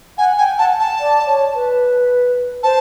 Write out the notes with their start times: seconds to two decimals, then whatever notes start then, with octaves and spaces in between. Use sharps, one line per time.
0.18 F#5 G#5
0.38 G5 G#5
0.58 F#5 A5
0.79 A5
1.00 D5
1.27 C#5
1.55 B4
2.63 C5 A5